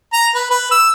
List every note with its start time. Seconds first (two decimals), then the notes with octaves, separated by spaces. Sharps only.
0.13 A#5
0.34 B4
0.51 B4
0.71 E6